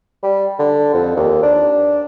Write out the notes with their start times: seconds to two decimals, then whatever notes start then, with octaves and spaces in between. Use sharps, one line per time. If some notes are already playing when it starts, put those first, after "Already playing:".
0.23 G3
0.59 D3
0.94 F2
1.16 D#2
1.42 D4